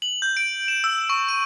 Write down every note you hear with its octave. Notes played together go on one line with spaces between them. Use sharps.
F#7
G6
D7
E7
E6
C#6
D#7